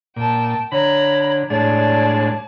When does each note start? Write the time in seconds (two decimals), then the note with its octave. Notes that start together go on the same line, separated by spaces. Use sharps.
0.16 A#2 G5 A5
0.72 D3 C#5 A#5 B5
1.50 A2 G#3 D4 C#5 D5 A5